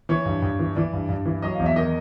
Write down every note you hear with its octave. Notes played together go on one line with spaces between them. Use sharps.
E3 C#5
G2
G2
E3
E3 D5
G2
G2
E3
F#3 D#5
E2 F5
E5
D#3 D#5